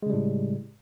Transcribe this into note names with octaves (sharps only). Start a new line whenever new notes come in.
A2 C#3 G3 G#3